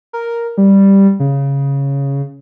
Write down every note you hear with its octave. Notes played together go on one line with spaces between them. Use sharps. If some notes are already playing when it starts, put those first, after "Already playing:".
A#4
G3
C#3